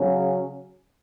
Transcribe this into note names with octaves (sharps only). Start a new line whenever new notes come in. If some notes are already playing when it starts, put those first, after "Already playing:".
Already playing: C#3 F#3 C#4